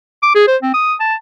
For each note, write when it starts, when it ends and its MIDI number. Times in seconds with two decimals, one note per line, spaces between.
0.23 0.31 86
0.35 0.46 68
0.47 0.57 72
0.62 0.73 60
0.74 0.95 87
1.00 1.15 81